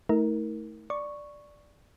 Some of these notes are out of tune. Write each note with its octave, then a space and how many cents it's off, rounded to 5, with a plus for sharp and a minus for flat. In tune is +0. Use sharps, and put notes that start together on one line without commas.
A3 +0 D#4 +45 A#4 +0
D5 +0 C#6 +0